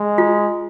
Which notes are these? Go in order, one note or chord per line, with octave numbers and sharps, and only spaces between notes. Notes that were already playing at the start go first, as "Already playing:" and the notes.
Already playing: G#3
F4